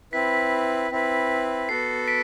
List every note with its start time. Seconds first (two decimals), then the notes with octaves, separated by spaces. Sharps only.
0.13 C4 E4 B4 B6
0.91 C4 E4 B4
1.69 B3 F#4 A4 C7
2.08 B6 D7